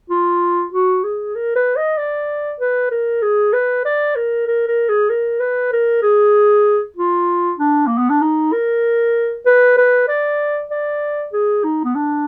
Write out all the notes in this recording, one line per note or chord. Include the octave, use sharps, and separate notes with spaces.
F4
F#4
G#4
A#4
B4
D#5
D5
B4
A#4
G#4
B4
D5
A#4
A#4
A#4
G#4
A#4
B4
A#4
G#4
F4
D4
A#3
B3
D4
D#4
A#4
B4
B4
D5
D5
G#4
D#4
B3
D4